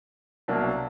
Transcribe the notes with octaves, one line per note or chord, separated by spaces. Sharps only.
C2 B2 F#3 A#3 D4